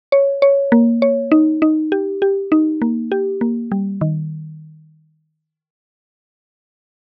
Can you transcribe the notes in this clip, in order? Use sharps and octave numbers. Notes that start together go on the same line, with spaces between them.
C#5
C#5
A#3
C#5
D#4
D#4
G4
G4
D#4
A#3
G4
A#3
G3
D#3